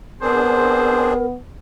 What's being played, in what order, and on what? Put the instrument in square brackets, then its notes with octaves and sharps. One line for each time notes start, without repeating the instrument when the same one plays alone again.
[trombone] B3 [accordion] C4 D4 G#4 [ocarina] A#4 [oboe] C5